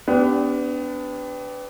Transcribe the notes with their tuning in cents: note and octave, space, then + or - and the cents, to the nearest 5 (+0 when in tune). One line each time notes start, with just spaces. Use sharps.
B3 +25 D4 -15 G4 +0